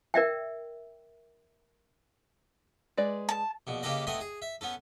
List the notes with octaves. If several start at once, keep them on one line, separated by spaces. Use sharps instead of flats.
A#4 D5 E5 G5
G#3 B4 D5
A5
A#1 B2
C#3 A#3 G4 A4 B4 D#5
A3 B3 C4 D#5 G#5
G#4
E5
B3 C#4 A4